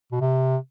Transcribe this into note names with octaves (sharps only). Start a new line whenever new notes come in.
B2
C3